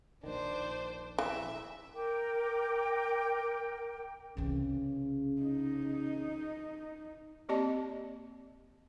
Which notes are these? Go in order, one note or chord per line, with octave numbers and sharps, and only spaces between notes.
A#1 D#3 D4 C5
E3 E5
A#4 G5 D6
C2 C#3 E3
D#4
A#3 C4 G4 D5 D#5 A5